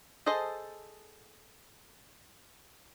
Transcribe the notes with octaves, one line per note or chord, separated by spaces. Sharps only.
G#4 A4 C5 D#5 A5